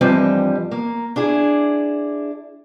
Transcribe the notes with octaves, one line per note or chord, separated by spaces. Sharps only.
G2 E3 F3 G3 C4 D#5
A#3
D4 E4 G#4